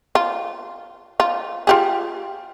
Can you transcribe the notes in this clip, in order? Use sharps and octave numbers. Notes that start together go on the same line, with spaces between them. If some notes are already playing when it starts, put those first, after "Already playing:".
F4
F4
F4 G4 G#4